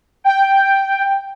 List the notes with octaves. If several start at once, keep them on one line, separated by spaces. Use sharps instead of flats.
G5